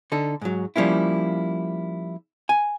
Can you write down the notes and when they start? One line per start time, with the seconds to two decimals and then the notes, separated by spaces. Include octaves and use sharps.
0.12 D3 D#4 A4
0.41 G#2 F#3
0.76 F3 G3 A#3 C#4 E4
2.49 G#5